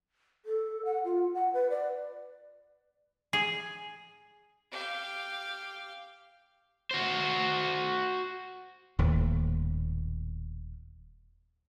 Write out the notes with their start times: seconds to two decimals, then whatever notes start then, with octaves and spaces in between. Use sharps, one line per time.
0.45 A4
0.85 F#5
1.05 F4
1.34 F#5
1.54 B4
1.70 D5
3.33 G#4
4.71 G4 F5
6.91 F#4 C5
8.99 D#1 D#2 A2